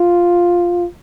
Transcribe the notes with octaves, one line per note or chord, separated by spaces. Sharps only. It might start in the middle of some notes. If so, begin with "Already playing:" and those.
Already playing: F4